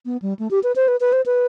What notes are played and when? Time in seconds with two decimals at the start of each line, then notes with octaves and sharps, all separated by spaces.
0.06 B3
0.22 G3
0.39 A3
0.51 G4
0.63 B4
0.76 C5
0.88 B4
1.00 B4
1.13 C5
1.26 B4